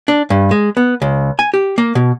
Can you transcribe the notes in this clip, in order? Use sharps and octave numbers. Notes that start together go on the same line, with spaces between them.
D4
G2
G#3
B3
C#2
G#5
G4
A#3
B2